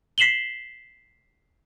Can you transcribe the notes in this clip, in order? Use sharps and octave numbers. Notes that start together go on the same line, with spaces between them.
B6 C7 E7 F#7 G7